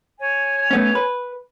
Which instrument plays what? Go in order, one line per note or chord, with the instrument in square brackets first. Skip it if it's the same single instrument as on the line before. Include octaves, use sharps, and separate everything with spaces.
[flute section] C#5 G#5
[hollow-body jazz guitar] A3 B3 C#4
B4